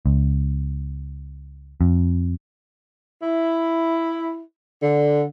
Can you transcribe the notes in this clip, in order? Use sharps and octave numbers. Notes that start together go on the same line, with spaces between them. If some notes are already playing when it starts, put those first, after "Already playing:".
C#2
F2
E4
D3